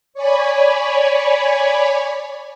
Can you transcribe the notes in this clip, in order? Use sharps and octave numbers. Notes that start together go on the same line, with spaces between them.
C#5 D5 G#5 B5